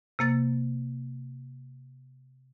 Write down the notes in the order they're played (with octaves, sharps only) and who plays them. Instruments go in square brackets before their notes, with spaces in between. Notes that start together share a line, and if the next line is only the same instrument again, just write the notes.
[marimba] C3 A#3 A6